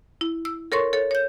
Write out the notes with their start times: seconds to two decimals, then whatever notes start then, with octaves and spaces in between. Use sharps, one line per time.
0.21 E4
0.45 E6
0.72 A4 A#4 C#5 C6 C#6
0.93 A4 C#5
1.11 C#5 G6